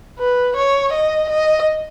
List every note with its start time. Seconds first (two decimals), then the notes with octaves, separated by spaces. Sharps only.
0.19 B4
0.56 C#5
0.92 D#5
1.29 D#5